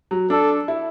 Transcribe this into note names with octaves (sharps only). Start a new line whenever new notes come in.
F#3
D4 A4
E4